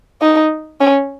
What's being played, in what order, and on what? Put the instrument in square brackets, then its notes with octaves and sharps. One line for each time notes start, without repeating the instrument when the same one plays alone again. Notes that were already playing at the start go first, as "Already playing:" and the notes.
[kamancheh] D#4
C#4